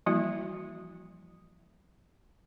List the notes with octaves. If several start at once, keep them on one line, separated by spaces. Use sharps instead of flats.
E3 F3 G3 A#3 E4 F#4